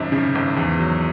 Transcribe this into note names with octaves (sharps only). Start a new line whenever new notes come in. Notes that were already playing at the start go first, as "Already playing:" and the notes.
Already playing: G#1 F#2
C#3
G#1
E2
F#3